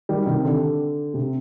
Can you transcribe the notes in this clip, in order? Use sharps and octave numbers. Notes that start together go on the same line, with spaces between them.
D#3 G3
C3 D#3
D3
C3